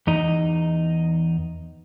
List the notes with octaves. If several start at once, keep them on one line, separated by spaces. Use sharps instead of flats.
E2 D#4